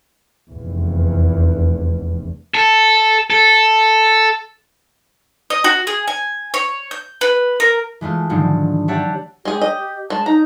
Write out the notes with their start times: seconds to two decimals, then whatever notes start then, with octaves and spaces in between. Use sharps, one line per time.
0.52 F1 E2
2.55 A4
3.30 A4
5.50 D#5
5.64 F#4
5.87 G#4
6.08 G#5
6.54 C#5
6.91 G6
7.21 B4
7.60 A#4
8.01 E3 G#3 A3 F4
8.30 G#2 D3 D#3 F3 F#3
8.88 D4 G4 C#5 E5 F#5 A5
9.45 G#3 G4 G#4
9.61 D#5
10.10 G#3 A5
10.26 D#4 A#5